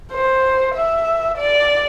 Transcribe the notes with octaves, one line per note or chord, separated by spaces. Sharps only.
C5
E5
D5